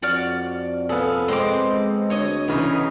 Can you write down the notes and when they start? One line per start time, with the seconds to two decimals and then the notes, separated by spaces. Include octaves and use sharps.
0.02 F2 F#4 D5 F6
0.89 B3 G#4 A4 F5
1.28 G#3 C4 C5 D6
2.10 D2 C#5 D#5 D#6
2.48 C#3 E3 B3 C#4 D#4